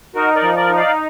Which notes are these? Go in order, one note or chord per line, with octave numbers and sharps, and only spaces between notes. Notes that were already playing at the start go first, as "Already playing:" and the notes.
D#4 F#4 A#4
A#4 D5
F3
A#4 D5
D#4
D5 F5